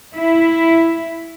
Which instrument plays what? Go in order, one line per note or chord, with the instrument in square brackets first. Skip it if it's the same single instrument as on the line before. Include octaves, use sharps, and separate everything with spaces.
[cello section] E4